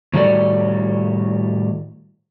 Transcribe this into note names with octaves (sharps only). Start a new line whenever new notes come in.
A2 D#3 G3 F#4 A4 D5